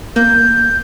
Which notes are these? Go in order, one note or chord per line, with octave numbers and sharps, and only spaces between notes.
A#3 G6